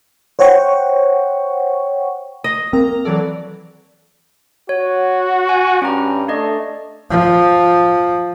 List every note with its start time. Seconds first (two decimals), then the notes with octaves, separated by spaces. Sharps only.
0.39 C5 C#5 F#5 G5 C#6
2.44 D#5
2.73 A#3 C4 A#5
3.05 E3 F#3 A4 D5
4.69 F#4 C#5
5.49 G#5
5.82 G2 C#4 A#5
6.28 A3 D4 D5 D#5
7.10 F3